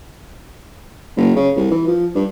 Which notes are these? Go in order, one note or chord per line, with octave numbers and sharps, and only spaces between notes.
F#1
C#3
C2
E3
F3
G2